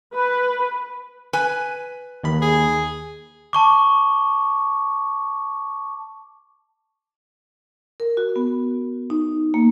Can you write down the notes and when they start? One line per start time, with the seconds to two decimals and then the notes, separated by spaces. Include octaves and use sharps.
0.14 B4
1.33 B4 G#5
2.24 D#2 D#3 B5
2.41 G#4
3.53 A5 C#6 D6
8.00 A#4
8.17 F#4
8.36 B3
9.10 D#4
9.54 A#3